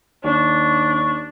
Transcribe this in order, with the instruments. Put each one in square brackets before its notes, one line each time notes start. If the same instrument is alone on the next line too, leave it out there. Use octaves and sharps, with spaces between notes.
[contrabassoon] D#2 [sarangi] D4 [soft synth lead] C#6